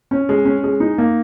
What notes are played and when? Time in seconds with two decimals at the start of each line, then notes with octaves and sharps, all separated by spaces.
0.11 C#4
0.29 G#3
0.45 C#4
0.64 G#3
0.80 D#4
0.98 A#3